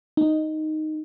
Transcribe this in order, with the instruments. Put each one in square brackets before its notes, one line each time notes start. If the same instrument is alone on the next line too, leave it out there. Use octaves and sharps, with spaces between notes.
[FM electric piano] D#4